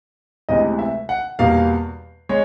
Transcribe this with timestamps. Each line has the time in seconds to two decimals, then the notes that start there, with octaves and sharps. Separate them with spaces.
0.49 D2 C3 E3 G#3 B3 D#5
0.79 E5
1.09 F#5
1.39 E2 B2 G3 A#3 F5
2.29 G#3 C#5